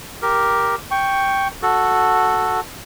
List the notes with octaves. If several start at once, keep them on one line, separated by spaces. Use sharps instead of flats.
G4 A#4
G5 C#6
F#4 A4